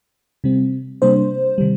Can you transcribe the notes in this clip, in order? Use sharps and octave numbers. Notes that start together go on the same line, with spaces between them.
C3 G3 C4
C3 G3 A#3 D4 C5
C3 D#3 G3